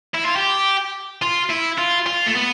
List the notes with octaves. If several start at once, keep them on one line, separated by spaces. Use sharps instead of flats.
E4
F4
G4
F4
E4
F4
F4
A3
B3